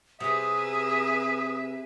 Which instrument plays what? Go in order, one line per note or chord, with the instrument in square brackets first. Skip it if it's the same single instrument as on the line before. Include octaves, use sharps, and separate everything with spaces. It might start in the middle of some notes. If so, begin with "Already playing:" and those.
[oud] C3 [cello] G#4 B4 [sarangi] E5 [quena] D#6